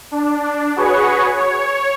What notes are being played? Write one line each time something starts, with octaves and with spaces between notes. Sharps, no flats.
D4
F#4 G#4 B4 C#5 C#6
C#5